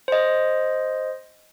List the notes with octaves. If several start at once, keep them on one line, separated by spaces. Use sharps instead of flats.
C5 D#5